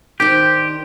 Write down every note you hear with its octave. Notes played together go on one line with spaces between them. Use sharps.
D#3 D4 G4 C5